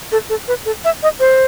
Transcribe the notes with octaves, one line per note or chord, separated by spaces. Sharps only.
A4
A4
B4
A4
E5
D#5
C5